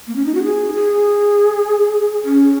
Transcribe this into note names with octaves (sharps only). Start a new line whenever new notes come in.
A#3
C#4
D#4
F#4
G#4
G#4
C#4